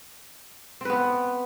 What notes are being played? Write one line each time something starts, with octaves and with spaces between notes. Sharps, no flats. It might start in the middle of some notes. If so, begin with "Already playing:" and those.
B3 C4 B4